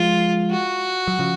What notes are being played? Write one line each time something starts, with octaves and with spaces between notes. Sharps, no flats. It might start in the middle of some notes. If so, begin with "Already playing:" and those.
Already playing: F3 G#3 F4
F#4
F#3
C#3 F3